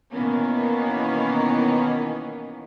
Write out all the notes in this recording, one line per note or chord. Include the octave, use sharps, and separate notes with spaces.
B2 D#3 E3 A#3 B3 C#4